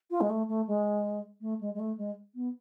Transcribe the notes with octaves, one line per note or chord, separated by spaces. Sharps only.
F4
G#3
A3
A3
G#3
A3
G#3
G#3
A3
G#3
B3